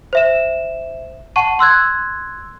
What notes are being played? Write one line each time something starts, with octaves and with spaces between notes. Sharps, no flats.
C5 E5 E7
F#5 A5 C#6 D#7
C6 E6 F#6 G#6